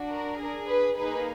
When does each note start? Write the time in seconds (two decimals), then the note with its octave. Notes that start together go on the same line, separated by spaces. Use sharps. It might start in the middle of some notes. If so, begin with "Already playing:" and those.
Already playing: D4 F#4
0.10 A#4
0.39 D4 G#4
0.68 B4
0.96 A#3 D#4 G#4 B4